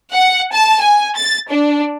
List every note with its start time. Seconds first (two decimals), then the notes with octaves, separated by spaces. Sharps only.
0.12 F#5
0.52 A5
0.82 G#5
1.16 A6
1.50 D4